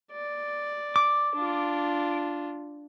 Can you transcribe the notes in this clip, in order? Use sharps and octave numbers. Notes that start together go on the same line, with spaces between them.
D5
D6
D4 F4